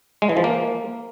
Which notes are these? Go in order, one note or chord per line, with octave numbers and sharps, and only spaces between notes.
G#3
E3
F3
A#3